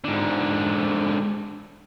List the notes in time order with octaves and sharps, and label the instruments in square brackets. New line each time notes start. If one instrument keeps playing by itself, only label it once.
[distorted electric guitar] G#2 D3